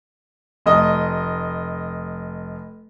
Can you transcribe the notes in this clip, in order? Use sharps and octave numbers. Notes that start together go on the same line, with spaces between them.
F1 D#5